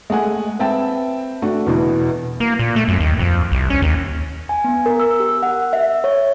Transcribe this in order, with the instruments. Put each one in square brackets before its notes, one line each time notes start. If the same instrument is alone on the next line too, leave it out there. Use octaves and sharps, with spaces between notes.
[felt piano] G#3 A3 F#5 G#5
C4 B4 E5 G5 A5
A3 D4 F#4
E2 B2 E3
[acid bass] A#3
A#2
A3
F#2
D#2
F2
C2
C#4
D#2
[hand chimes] G#5
B3
A#4
E6
G4
F#5
E5
C#5